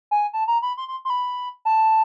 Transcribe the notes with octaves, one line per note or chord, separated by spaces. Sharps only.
G#5
A5
A#5
B5
C6
C6
C6
B5
A5